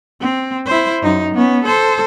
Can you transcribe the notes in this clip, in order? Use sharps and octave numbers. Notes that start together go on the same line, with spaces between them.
C4
E4 C5
F#2 D#4
B3 C#4
A4 C5